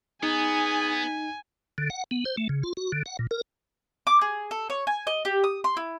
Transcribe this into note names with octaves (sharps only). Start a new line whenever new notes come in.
B3 D#4 G#4 G#5
D3
F#5
B3
C5
A3
C#3
F4
F#4
D3
F#5
A#2
A#4
D6
G#4
A4
C#5
G#5
D#5
G4
D#6
C6
E4